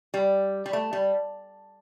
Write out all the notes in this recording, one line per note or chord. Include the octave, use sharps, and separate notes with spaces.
G3
G3
A3
G3